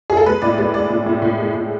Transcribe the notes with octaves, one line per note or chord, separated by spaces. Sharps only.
G#4
A4
G#3 B4
A2 D5
G#3 D5
G#3 D5
A2
A2
A2
G#3
A2